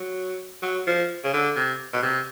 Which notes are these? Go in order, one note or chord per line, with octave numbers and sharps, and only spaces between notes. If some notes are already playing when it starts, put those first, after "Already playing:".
Already playing: F#3
F#3
F3
C#3
D3
C3
B2
C3